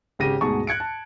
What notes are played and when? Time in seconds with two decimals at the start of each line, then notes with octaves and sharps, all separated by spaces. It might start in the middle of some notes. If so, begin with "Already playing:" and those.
0.19 G#1 C#3 G4 A#6 D#7
0.41 D2 G#2 B2 G#4 A5 C#6
0.67 F#6 G#6 C#7 D7
0.80 A5